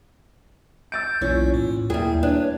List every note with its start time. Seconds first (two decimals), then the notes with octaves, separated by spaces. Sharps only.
0.92 E6 G6 A6 D7
1.22 B1 E2 A#2 C#4
1.54 A2
1.90 D#2 G3 A#3 E4 G#4
2.23 D4 B4 C#5